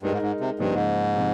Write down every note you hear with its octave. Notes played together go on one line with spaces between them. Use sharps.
G2 G#3 D#4 A#4
G#2
G#2
C3
G2 C#3 F3 A#3 D#4
G#2
C3 F3 C4